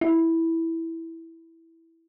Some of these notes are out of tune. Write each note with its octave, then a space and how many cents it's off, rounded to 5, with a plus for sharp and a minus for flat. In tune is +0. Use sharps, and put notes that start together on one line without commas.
E4 -5